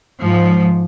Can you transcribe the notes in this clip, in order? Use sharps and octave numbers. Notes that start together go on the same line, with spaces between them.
G#2 F3